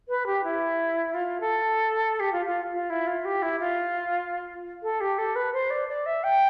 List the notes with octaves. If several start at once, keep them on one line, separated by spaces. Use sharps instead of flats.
B4
G4
E4
F4
A4
G4
F4
F4
F4
E4
F4
G4
E4
F4
A4
G4
A4
B4
C5
D5
D5
E5
G5